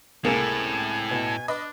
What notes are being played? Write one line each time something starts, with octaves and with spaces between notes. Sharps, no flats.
C#2 A2 C3 A#3 G#4 G#5
B2
D4 B4 D#5 B5